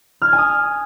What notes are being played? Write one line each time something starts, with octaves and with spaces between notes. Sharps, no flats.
F6
G#6
G#5
D#6